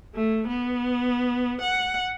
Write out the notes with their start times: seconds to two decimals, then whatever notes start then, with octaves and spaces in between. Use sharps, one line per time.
0.15 A3
0.47 B3
1.61 F#5